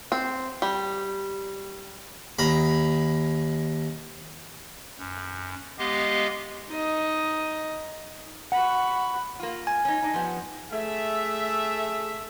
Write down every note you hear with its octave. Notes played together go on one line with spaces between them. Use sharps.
C4
G3
D#2 A#5 B5
F#2
G#3 B3 G4 D#5 F5
D#4 D#5
F#4 F#5 B5
A#3 F4
G#5
C#4 D#4
D4 D#4
F3 G3 B3
A3 G#4 E5